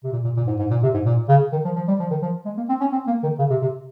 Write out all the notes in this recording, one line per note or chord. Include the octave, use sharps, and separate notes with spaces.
C3
A#2
A#2
A#2
G#2
G#2
A#2
C3
G#2
A#2
C#3
D#3
F3
F3
G3
F3
D#3
F3
G#3
A#3
C4
C#4
C4
A#3
D#3
C#3
C3
C3